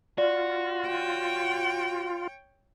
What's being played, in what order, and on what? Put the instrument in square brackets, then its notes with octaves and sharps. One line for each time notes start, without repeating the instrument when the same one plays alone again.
[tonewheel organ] F4 [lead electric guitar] F#4 [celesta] D5
[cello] C#5 G5